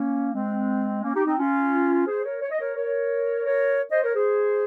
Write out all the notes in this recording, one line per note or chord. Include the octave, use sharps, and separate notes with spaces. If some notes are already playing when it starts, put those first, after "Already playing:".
Already playing: A#3 C#4
G#3 C4
A#3 C#4
D#4 G4
C4 D#4
C#4 F4
G#4 C5
A#4 C#5
C#5
D#5
A#4 C#5
A#4 C#5
A#4 C#5
C5 D#5
A#4 C#5
G#4 C5